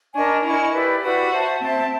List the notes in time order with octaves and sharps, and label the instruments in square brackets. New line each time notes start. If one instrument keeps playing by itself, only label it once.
[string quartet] D4 [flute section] A#4 D#5 G#5 C#6
[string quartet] E4 [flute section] A#4 D#5 G#5 C#6
[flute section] E4 G4 B4 D5
[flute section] E4 G4 B4 D5 [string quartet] F#4
[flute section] C5 E5 A5
[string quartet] C4 [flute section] C5 E5 A5